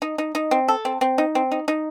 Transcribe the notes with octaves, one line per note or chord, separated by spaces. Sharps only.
D#4
D#4
D#4
C4
A4
C4
C4
D#4
C4
D#4
D#4